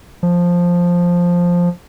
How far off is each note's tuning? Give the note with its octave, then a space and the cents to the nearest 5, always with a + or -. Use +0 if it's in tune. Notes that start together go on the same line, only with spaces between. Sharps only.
F3 +5